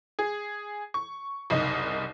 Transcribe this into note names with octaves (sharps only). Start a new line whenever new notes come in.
G#4
C#6
F#1 C2 D#4 D#5